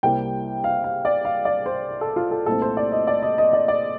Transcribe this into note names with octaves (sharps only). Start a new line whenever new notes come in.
C2 C3 G3 A#3 G5
F5
F5
D5
F5
D5
C5
A4
F4
A4
C2 A#2 A3 C4 A4
C5
D5
D#5
D5
D#5
D#5
D5
D5